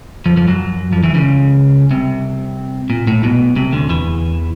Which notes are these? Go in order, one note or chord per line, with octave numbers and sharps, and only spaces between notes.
F2 F3
F2 F3
F#2 F#3
F2 F3
E2 E3
C#2 C#3
C2 C3
A#2
A2
B1 B2
C2 C3
D2 D3
E2 E3